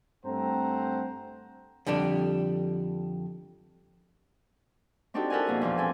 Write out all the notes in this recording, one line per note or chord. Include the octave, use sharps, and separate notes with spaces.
G2 A3 C4 C5 F#5 A#5
F2 D3 G3 D4
C4 D4 D#4 F#4 G4 A4
E4 A4 A#4 F#5 G#5
F2 B2 A#3 G#4
E2 A#2 F3
C4 A4 G#5